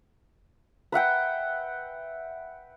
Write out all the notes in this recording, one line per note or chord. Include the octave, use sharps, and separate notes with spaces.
B4 E5 F#5 G5